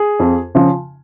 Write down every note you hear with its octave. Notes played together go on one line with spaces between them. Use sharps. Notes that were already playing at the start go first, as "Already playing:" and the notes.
Already playing: G#4
F2
C#3 F3